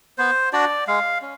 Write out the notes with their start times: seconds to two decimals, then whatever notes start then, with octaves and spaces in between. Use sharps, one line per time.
0.18 B3 C5
0.53 D4 F#4 D5
0.87 G#3 F5
1.22 C#4